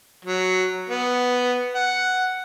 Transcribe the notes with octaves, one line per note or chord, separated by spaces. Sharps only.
F#3
B3
F#5